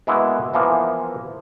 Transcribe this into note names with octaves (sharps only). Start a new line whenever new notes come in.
G#3 A#3 B3 E4 F#4
E3 F3 A#3 B3